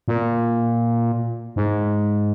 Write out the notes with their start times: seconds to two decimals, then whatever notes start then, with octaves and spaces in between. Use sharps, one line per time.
0.08 A#2
1.56 G#2